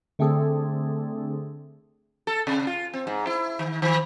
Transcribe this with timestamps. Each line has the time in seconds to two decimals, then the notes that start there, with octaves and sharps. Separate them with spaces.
0.19 D3 A3 C4 D4 G#4 A4
2.27 A4
2.47 C3
2.67 F4
2.94 C4
3.07 G#2
3.27 E4
3.59 D#3
3.82 D#3